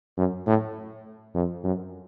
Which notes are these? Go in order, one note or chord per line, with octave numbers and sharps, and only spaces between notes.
F#2
A2
F2
F#2